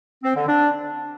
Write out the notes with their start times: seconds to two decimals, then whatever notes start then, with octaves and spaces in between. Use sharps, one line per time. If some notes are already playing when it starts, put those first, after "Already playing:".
0.24 C4
0.35 D3
0.47 D4